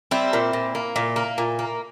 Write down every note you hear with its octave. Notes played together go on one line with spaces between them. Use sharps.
G3 C4 E4
A#2
A#2
A#3
A#2
A#3
A#2
A#3